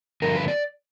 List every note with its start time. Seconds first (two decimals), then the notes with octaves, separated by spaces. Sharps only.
0.22 G2 D3 F3 A#4
0.36 B4
0.48 D5